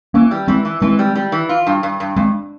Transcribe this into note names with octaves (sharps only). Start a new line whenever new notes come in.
E3 A#3 C#4
G3
E3 G#3 C4
E3
E3 G#3 C4
G3
G3
E3
F4
G2
G2
G2
G2 G#3 C4